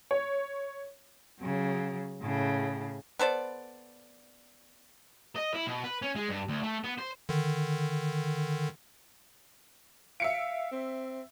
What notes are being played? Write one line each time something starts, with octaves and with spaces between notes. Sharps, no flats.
C#5
C#3 F#3
A2 C#3
B3 A4 C5 D5
D#5
E4
B2
B4
C#4
G#3
G2
D2
A3
B3
C5
D3 D#3
E5 F5 C#7 D7
C4